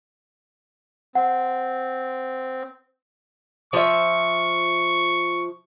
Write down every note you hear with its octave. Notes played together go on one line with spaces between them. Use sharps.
C4 F#5
F3 E5 C#6